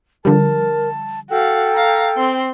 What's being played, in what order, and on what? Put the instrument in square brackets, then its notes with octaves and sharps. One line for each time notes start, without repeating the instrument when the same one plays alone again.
[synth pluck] D3 F3 G3 [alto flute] A#4 [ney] A5
[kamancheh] F#4 F5 [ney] A4 [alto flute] G5
[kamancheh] F5 A#5
C4 C6